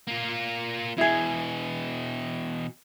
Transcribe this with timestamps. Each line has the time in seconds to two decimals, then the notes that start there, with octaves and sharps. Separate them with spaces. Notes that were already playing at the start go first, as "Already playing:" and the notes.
0.07 A#3 F4
0.98 B2 E3 E4 G#4